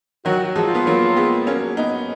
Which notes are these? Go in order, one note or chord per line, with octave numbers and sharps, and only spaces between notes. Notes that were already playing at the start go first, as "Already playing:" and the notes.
D#3 F#3 F#4
F#4
F3 G#3
F4
B3
F#3 A#3
G#3 B3
A#3 C#4 F#4
B3 D#4